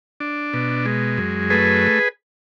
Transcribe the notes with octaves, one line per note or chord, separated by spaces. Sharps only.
D4
B2
G#3
F#2
A3 G#4 B4